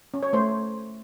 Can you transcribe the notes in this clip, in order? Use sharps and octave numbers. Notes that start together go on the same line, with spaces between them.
C#4
C#5
A3 C5